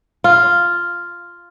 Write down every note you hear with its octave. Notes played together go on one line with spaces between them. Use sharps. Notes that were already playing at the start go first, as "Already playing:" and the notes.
F4